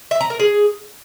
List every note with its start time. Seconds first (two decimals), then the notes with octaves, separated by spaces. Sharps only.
0.11 E5
0.21 A#5
0.30 A#4
0.40 G#4